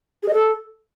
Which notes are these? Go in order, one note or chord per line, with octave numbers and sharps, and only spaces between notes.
G#4
D#5
A4